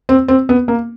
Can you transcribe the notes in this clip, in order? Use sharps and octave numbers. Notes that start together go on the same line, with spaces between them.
C4
C4
B3
A#3